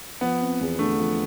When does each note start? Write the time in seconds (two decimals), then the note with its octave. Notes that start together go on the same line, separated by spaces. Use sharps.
0.21 F3 B3
0.41 C4
0.61 E2
0.79 D3 A3
0.99 F3